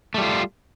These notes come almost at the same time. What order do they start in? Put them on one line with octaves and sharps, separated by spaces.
A3 G3 F4